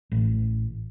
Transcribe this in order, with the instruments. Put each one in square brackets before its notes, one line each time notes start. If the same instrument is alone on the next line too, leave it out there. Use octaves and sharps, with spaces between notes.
[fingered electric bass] A1